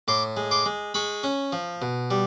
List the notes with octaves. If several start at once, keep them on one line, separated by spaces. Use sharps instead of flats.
A2 C6 D6
G#3
C6 D6
G#3
G#3 B5 C#6
C#4
F3
B2
G3